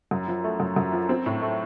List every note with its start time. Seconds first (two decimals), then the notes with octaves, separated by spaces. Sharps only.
0.11 F#2
0.28 F3
0.44 A3
0.60 F#2
0.76 F#2
0.93 F3
1.09 C4
1.26 A2
1.42 A3